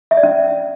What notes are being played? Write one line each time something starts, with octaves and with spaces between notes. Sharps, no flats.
E5
D5
C#4